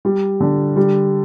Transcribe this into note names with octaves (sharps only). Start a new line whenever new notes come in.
G3
D3
G3